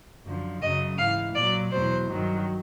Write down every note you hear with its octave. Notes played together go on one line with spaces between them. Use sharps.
F#2 D3 F3
F#2 C#3 F#3 D#5
G#2 E3 F5
A#2 F#3 D5
E2 B2 F#3 C5
G2 D#3 F#3